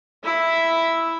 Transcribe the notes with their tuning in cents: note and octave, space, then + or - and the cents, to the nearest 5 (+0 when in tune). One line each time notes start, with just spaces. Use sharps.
E4 +0 E5 +0